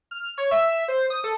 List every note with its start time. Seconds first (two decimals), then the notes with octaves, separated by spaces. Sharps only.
0.11 F6
0.38 C#5
0.51 E5
0.88 C5
1.10 D#6
1.24 A4